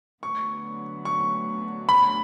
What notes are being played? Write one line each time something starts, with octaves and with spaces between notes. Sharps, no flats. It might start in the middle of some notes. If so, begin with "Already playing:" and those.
D2 D3 F#3 B3 C#6
C#6
B5